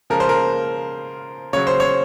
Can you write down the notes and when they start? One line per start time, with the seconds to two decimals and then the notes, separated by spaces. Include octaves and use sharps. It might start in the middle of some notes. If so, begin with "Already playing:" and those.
0.10 C#3 F3 G#3 A#4
0.20 C5
0.29 A#4
1.53 C#3 F#3 C#5
1.67 C5
1.80 C#5